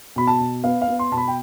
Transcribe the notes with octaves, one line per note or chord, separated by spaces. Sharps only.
B2 B5
A5
B2
B3 F5
F5
B3
C6
B2 A5
B5
G5